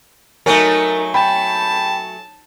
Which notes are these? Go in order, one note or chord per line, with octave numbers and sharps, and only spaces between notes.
F#3 A3 D#4 A#4 C#5 G#5
G5 A5 B5